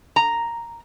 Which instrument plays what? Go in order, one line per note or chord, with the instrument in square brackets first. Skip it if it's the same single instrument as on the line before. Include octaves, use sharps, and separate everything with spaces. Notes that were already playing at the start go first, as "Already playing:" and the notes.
[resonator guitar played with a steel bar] A#5